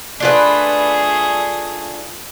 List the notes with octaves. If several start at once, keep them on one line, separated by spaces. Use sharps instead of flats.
A3 D4 F4 G#4 B4